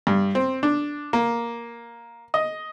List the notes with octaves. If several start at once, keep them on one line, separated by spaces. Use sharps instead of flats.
G2
C4
D4
A#3
D#5